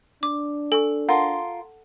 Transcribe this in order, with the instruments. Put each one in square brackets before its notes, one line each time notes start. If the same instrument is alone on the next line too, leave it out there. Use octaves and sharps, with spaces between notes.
[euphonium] D4 [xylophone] D6
[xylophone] A4 [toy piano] G#5 C#6
[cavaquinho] F4 A#4 C6 [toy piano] F#5 A5